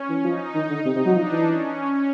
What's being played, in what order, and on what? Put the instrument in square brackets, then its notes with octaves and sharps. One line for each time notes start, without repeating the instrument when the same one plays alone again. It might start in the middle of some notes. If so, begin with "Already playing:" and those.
Already playing: [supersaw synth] C#4
[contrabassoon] E3
[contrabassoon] F3 [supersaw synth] D#4
[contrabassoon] D#3
D3
[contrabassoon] C3 [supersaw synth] D#4
[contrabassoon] C3
F#3
[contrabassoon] F3 [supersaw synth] D4
[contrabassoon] E3
[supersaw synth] C#4